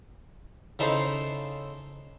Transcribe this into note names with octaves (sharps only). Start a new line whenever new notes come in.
C#3 D#4 E4 A4 C5